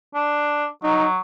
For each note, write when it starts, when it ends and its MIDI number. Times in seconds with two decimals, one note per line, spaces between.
0.15 0.66 62
0.83 1.19 54
0.83 1.07 63